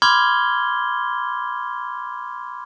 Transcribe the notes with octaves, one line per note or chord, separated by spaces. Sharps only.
B5 C6 D6 F6 G#6 G7